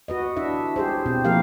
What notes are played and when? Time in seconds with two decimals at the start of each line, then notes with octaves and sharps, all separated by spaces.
0.08 F#4 B4 D#5
0.36 D4 E4 E5
0.76 G4 G#4 C5
1.06 B2 C4
1.25 F3 A#3 E4 G4 A#4 F5